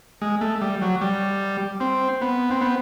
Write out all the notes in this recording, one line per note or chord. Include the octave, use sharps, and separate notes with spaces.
G#3
A3
G3
F#3
G3
C4
B3
C4
B3